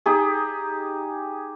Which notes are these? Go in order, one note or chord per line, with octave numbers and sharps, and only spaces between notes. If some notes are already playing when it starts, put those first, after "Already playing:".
D#4 G4 G#4